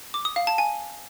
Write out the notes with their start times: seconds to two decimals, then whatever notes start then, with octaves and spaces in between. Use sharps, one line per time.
0.14 D6
0.25 D#6
0.36 F5
0.47 A5
0.58 G#5